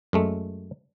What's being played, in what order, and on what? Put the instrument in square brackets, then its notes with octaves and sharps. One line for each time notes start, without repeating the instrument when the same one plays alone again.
[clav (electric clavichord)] F#2 G#3 A3